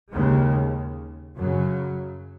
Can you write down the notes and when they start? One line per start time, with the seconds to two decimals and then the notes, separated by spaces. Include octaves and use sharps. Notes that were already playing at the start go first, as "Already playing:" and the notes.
0.12 D#2 C#3 G#3
1.36 F#2 C#3 F#3